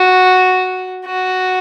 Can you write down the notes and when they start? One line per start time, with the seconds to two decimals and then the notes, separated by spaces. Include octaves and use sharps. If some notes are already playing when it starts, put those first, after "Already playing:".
Already playing: F#4
1.06 F#4